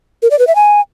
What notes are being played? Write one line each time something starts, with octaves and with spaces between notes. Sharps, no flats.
A#4
D5
B4
E5
G#5